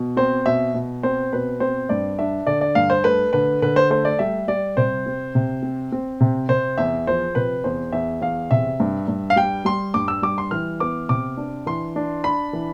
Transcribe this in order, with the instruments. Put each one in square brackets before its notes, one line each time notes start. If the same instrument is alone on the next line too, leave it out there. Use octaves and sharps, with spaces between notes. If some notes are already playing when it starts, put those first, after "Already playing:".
Already playing: [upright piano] B2
C4 C5
B2 E5
B2
C4 C5
B2 B4
C4 C5
G2 D5
D4 E5
D3 D5
D5
G2 F5
C5
A3 B4
D3 B4
D3 B4
C5
A3 C5
D5
G3 E5
G3 D5
C3 C5
C4
C3
C4
C4
C3
C3 C5
E2 E5
F3 C5
C3 B4
E2 C5
E2 E5
E2 F5
C3 E5
G2
G2
F5
G3 G5
G3 C6
G2 D6
E6
G3 D6
C6
E3 F6
B3 D6
C3 D6
D4
E3 C6
D4
D4 B5
E3